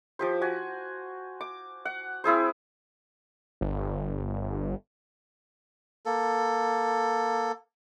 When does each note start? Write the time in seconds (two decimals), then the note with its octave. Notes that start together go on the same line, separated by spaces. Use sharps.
0.19 F3 G4 C5
0.42 F#4 G#5
1.41 D6
1.85 F#5
2.24 C4 E4 G#4 C5
3.61 G1
6.05 A#3 A4